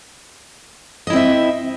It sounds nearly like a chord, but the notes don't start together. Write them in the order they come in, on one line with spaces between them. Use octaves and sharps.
D#5 E4 C4 E5